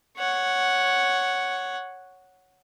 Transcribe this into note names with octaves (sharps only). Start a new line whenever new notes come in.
C#5 F#5